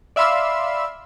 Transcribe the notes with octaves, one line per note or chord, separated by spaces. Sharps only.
D5 E5 F5 B5 C6 E6